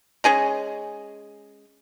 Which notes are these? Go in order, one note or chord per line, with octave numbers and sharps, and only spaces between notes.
G#3 C#4 G#4 D#5